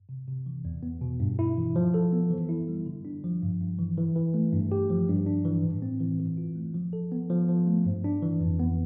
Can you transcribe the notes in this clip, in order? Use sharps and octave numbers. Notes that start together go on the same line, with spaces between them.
C3
C3
E3
E2
B3
B2
G2
E4
E3
F3
A4
B3
E3
E4
G3
D3
D4
F3
G2
G2
E3
E3
E3
A3
G2
G4
F3
G2
D4
E3
A2
C4
E3
E3
F4
A3
F3
A4
B3
F3
F3
A3
G2
D4
E3
F2
B3